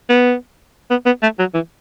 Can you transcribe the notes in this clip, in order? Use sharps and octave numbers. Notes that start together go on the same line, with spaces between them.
B3
B3
B3
A3
F#3
E3